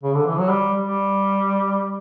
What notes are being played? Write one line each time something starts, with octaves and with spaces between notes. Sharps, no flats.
C#3
D3
E3
F#3
G3
G3